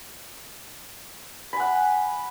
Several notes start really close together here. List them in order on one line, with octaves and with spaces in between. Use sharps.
B5 G#5 F#5